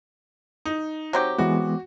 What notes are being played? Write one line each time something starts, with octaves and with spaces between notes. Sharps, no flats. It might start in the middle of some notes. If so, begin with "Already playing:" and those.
D#4
F#3 C4 G4
E3 G#3 B3 F#4